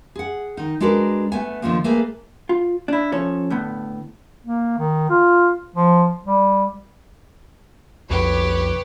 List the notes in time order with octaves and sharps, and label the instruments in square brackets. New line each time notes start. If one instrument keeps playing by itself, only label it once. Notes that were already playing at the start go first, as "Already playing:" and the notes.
[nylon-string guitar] G#4 F#5
D#3 D#4
G#3 D4 F#4 A#4 B4 D5
A3 B3 G#5
D3 D#3 F3 A3 A#3
A3 A#3 G#4 B4 G#5
[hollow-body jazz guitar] F4
D4 E4
F3 C#4 A4 C#5
A2 D3 B3
[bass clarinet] A#3
D#3
F4
F3
G3
[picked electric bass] B1 F2 [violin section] G4 B4 C#5